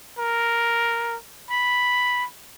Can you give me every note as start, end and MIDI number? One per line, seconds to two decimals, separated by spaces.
0.19 1.16 70
1.51 2.25 83